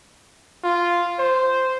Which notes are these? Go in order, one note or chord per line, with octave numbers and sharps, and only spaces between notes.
F4
C5